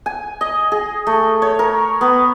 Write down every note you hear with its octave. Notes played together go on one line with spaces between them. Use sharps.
G#5
D#5
G#4
A3
C#5
A#4
B3